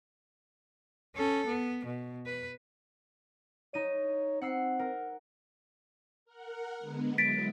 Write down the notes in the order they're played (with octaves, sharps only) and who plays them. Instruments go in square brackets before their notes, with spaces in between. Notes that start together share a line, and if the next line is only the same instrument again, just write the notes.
[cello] C#4 A4
B3
B2
B4
[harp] D#4 D#7 [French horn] C#5
[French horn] C4 [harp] F#5 E6 C7
[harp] A#4
[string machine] A#4 F#5
D3 G#3 B3
[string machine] F#3 G#3 E4 [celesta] A6 B6 D7